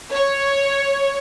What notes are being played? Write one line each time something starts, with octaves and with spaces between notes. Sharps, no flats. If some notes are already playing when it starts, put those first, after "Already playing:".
C#5